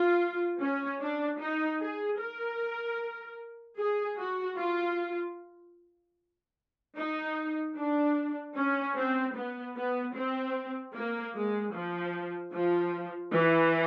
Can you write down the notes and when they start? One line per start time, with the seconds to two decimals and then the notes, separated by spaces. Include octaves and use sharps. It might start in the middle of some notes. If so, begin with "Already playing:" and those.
Already playing: F4
0.60 C#4
1.00 D4
1.40 D#4
1.80 G#4
2.19 A#4
3.78 G#4
4.18 F#4
4.58 F4
6.96 D#4
7.76 D4
8.56 C#4
8.96 C4
9.35 B3
9.76 B3
10.14 C4
10.94 A#3
11.35 G#3
11.74 F3
12.53 F3
13.33 E3